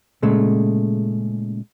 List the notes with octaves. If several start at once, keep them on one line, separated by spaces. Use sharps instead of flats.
A#2 C#3 G#3 A3